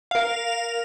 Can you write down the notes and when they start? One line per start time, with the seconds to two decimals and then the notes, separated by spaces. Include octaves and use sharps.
0.11 A#4 F5